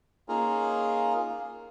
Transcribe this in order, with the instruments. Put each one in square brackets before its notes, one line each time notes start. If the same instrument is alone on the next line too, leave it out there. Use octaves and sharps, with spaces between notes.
[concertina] A#3 C#4 D#4 F4 G#4 A#4